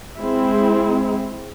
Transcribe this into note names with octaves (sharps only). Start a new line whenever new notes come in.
G#3 C4 E4